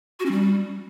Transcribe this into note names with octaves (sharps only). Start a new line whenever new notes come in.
F#4
C#4
G3